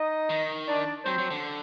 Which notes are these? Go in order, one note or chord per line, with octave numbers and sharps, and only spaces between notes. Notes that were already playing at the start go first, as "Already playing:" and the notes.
Already playing: D#4 D#5
D#3
D4 D5
F#3 C4 C5
F#3
D3